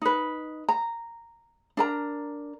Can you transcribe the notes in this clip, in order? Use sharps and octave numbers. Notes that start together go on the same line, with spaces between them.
D#4 B4
A#5
D4 A#4 A#5